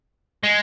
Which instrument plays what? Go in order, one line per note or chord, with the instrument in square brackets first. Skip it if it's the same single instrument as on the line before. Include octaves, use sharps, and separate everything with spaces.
[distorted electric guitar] G#3